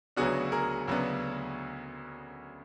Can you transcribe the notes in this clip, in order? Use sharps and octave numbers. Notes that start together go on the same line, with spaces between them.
D2 C#3 F#3 B3 D4 F#4 G#4
G#4 A#4
D2 C#3 F#3 B3 D4